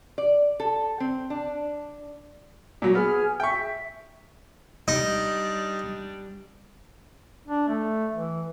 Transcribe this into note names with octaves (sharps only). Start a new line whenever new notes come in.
D5
A4
C4
D4
A#2 F#3 F#4
B3 G#4 F6
E5 G5 C#6
G3 D4 D#4
D4
A3
E3